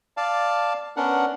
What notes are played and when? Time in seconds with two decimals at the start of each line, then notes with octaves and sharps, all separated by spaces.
0.17 D5 F5 A5
0.97 B3 C#4 D4 A#4 F#5